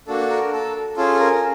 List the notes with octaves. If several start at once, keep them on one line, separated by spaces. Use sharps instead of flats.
A#3 D4 F#4 A4
A#4
A4
C#4 F4 G#4 A4
A#4